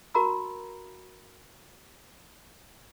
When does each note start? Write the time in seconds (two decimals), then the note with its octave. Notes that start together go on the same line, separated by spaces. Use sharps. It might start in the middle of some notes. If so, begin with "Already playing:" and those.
0.14 F#4 A#4 A#5 B5 E6